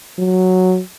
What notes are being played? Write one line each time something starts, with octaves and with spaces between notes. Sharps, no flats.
F#3